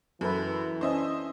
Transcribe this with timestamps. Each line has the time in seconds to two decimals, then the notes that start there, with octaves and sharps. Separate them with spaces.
0.21 F#2 E3 E4 A4 B4
0.81 C#4 D4 C5 D#5 E5